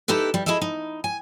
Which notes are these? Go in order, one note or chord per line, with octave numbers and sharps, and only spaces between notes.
D#4 E4 G4 A4 B4
G3
E4 G#4 A4 D#5 E5
D#4
G#5